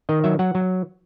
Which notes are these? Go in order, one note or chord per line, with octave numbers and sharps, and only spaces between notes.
D#3 D#5
F#3 E5
F#3 F#5
F#3